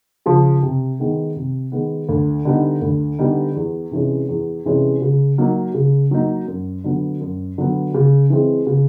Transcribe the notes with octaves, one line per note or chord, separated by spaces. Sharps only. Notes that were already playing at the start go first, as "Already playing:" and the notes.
C#3 F3
C3
D#3 G#3 B3
C3
D#3 G#3 B3
D2
D3 G3 B3 D#4
D2
D3 G3 B3 D#4
E2
C3 E3 G#3 C#4
E2
C3 E3 G#3 C#4
C#3
F#3 A#3 D#4
C#3
F#3 A#3 D#4
F#2
D3 F#3 B3
F#2
D3 F#3 B3
C#3
E3 G#3 C4
C#3